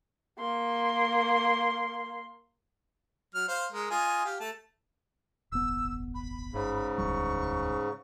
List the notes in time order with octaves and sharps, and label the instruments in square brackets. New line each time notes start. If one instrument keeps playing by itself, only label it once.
[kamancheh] A#3 C6
[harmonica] F#3 F6
C5 F5
G#3 A#4
F4 D#5 G#5
G4 F5
A3 A5
[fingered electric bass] D#1 G#1 B3 [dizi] E6
[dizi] B5
[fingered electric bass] G1 [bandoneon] G#2 C#3
[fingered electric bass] E1 D2 G3 [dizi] C#6